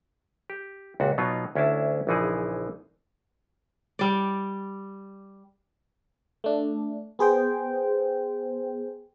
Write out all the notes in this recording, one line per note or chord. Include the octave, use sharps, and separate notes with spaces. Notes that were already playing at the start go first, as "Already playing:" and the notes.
G4
C#2 A#2 F#4
B2 F#3 B3 D#4 F4
D2 C#4 D4 E4 A5
A#1 C#3 E3 F3 D#4 G#4
G3 D5
A3 D4
B3 G#4 C5 G5